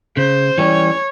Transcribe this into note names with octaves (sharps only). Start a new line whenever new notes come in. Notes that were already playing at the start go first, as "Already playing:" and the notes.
C#3 C5
E3 G3 C#4 C#5